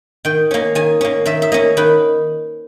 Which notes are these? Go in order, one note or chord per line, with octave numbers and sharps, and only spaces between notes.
D#3 G5
A#3 C#4
D#3 G#5
A#3 C#4
D#3 E5
E5
A#3 C#4 D#5
D#3 B4